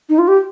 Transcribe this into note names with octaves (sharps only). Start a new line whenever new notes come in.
D#4
F4
G4